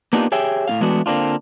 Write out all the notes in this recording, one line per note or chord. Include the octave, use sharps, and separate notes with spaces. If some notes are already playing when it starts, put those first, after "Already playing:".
A#3 B3 D4 D#4 F4 G4
G4 G#4 C#5 E5 G5
A2 C#4 F5
E3 G#3 A3 B3 D4 F#4
D3 A#3 C4 D4 F4